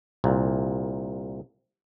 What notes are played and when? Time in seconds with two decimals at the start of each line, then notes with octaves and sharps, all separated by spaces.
0.24 C2 A#2